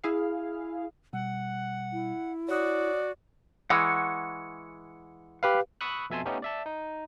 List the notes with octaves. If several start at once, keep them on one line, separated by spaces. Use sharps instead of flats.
E4 G#4 F5
B2 G3 F#5
E4
F#4 C#5 D5 D#6
E3 G#3 F#5 C#6
G4 B4 F5
B5 C#6 D#6 E6 F#6
F2 B2 E5 G#5 A5 C6
A3 B3 C#4 D#4 G4 A4
D5 E5 A5
D#4